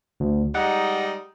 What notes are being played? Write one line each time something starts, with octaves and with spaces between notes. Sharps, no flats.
D2
G3 G#3 D#4 F#5